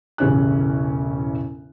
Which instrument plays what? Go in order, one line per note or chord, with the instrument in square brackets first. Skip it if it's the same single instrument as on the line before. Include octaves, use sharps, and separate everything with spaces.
[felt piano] E1 A1 C#3 C#4 G4 F#6